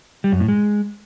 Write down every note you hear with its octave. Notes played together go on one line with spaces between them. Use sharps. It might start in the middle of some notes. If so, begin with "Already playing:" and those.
G3
F#2
A2
G#3